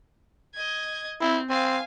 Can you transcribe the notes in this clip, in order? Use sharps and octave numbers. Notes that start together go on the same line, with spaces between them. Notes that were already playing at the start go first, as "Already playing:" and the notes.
D#5 G#6
C4 E4
C4 F5 G#5